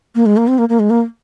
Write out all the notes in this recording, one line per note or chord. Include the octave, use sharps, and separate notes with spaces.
A#3
G#3
A#3
C4
A#3
A#3
G#3
A#3